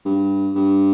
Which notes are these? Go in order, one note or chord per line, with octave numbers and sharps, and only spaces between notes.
G2
G2